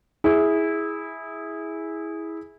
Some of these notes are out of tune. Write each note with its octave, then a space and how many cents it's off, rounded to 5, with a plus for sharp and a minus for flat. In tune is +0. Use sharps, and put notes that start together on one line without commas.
E4 -15 G#4 +0